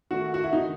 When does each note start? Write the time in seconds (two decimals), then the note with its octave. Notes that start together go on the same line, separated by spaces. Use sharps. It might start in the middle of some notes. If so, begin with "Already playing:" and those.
0.11 D#3 A3 F#4
0.34 F#4
0.44 E4
0.53 D#3 D#4